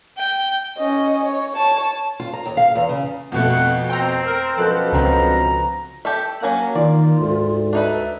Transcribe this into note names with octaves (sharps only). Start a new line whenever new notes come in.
G5
C#4 D#5
C#5
C#5 A5
F4
A#5
D#2
F5
E2
C#3
F2 B2 A3 F#5
C4 G5 A#5
A#4
F#2 B2 F3 A4 F#6
C#2 D3 C4 A#5
G4 A4 E5
F#3 A#3 C#4 F#5 G#5
D#3 F4 D5
D2 G#2
D4 D#4 B4 E5